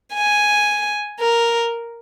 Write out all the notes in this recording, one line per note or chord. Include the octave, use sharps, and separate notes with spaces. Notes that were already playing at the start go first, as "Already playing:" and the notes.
G#5
A#4